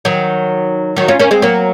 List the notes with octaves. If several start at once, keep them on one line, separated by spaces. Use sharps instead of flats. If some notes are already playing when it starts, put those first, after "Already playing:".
D#3 F#3
D#3 F#3
C#4 F4
A#3 C#4
G#3 C4
F#3 A#3